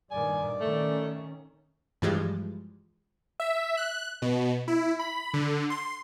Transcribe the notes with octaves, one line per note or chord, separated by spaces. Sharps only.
G2 A#2 D#3 D5 G#5
D#3 A3 C#4
G2 E3 F3 G3 G#3
E5
F#6
B2
E4
B5
D3
C6